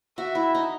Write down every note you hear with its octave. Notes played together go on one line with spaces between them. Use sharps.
F#4 E5
E4
D#4